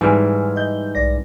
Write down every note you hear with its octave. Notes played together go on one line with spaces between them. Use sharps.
G#2 E3 G3 G#5 F6
D#5 G6
B1 D5 A#6